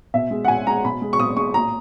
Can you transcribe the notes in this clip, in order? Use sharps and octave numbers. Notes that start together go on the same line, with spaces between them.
B2 E5
G#3
F#5
B2 G#5
G#3 A#5
B2 B5
G#3
C#6
B2 D#6
G#3 C#6
A#2 A#5